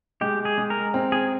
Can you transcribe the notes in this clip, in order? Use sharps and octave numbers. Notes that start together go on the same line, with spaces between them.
G#3 G4
G#4
G#3
A#4
C4
G#4